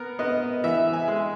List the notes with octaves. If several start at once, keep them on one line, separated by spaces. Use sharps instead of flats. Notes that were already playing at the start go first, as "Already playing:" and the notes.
Already playing: B3 A#4
B3 D#5
E3 E5
G#5
G#3